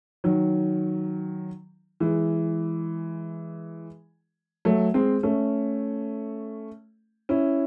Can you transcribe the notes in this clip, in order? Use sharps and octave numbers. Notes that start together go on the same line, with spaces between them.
D#3 F#3
E3 G#3
F#3 A3
G#3 C4
A3 C#4
C#4 E4